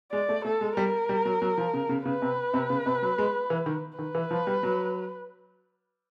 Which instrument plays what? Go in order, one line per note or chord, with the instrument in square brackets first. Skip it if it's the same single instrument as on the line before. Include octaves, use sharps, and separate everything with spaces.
[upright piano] G#3 [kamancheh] D5
[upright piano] A3
[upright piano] A3 [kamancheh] A4
[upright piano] G#3
[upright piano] G3 [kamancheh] A#4
[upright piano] G3
F#3
F#3
F3
C#3
C#3
[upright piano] C#3 [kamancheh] B4
[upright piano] C3
C3
C#3
C3
F#3
G#3
E3
D#3
[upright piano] D#3 [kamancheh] B4
[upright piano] E3
F3
G3
F#3